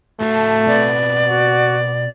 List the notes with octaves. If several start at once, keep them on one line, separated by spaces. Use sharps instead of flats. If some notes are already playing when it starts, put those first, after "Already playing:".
A2 A3 F#4 A5
B2 C4 B4 D5
F#4